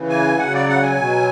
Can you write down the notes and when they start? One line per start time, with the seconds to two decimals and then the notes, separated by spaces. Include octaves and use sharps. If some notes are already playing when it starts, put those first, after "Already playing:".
Already playing: C#3 E3
0.09 G#5
0.38 C#3 F#3 F#5
0.53 D5
0.68 F#5
0.82 G#5
0.97 B2 F#3